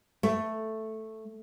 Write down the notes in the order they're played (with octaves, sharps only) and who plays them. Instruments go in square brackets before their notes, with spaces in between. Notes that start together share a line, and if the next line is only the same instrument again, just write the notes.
[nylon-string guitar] A3